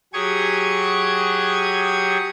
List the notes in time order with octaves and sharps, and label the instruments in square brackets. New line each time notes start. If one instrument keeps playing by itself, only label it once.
[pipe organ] F#3 G4 G#4 C#6 D#6 G#6